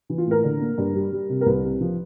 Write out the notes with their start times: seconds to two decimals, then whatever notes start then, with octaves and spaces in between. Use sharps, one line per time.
0.10 E3
0.18 F4
0.27 A2 A#4
0.44 D3
0.61 A#3
0.78 G2
0.95 G3
1.12 G3
1.29 C3
1.41 A#4
1.46 C2 B4
1.64 C3
1.81 F3